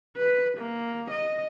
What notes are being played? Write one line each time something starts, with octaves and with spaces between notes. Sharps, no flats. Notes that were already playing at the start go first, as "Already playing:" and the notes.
B4
A#3
D#5